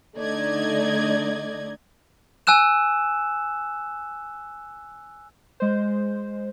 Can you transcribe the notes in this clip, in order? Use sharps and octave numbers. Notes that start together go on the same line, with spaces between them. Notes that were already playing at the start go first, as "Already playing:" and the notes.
D3 A3 D#4 D5 D#5 G#6
G#5 E6 F#6 E7
G#3 C5